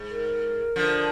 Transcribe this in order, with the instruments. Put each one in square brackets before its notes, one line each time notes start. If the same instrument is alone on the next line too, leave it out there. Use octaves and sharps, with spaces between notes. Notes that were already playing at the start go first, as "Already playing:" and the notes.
Already playing: [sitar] G#2
[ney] A#4
[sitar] D3 F3